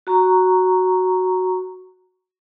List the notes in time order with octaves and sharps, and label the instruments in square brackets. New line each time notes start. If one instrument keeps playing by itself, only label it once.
[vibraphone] F#4 A#5 C#6